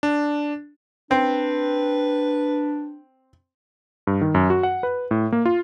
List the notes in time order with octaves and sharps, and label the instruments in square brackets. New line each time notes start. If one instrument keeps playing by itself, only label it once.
[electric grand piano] D4
[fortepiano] C4 [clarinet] D4 [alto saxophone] B4
[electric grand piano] G2
D#3
F#2
F#4
F#5
B4
A2
A#3
F4